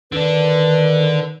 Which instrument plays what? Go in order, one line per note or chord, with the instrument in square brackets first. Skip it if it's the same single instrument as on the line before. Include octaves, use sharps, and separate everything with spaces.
[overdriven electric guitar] D3 D4 [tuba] D#3 [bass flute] B4